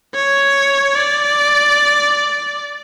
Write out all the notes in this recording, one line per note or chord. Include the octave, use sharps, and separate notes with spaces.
C#5
D5